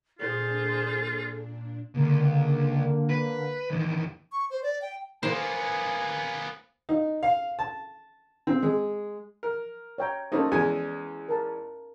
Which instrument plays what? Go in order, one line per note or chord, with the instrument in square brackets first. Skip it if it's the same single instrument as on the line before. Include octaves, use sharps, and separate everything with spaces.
[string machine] A#2 D4 [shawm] F4 [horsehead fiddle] G#4 C5 [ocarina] A4
[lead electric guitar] C#2 [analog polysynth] D3 A#3
[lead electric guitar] B4
E2 D#3
[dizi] C#6
C5
D5
G5
[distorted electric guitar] A#3 B3 [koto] C5 [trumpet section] G#5
[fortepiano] D#4
F5
A5
C4
G#3
A#4
[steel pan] C#5 G5 A#5
[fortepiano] A3 A#3 D#4 [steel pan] C#4 A4 C5
[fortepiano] E2 G#3 G#5 [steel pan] B4
[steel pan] A#4 A5